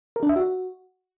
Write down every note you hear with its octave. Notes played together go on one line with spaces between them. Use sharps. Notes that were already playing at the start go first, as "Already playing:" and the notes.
A#4
D4
E5
F#4